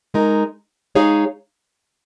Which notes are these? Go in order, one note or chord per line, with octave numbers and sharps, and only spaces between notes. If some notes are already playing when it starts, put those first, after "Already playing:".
G#3 D#4 A#4
G#3 D#4 G#4 C#5 F5